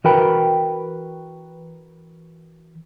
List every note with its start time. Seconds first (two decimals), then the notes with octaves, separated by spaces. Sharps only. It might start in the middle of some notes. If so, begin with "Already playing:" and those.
0.04 E3 F#4 A#4 B4 G5 B5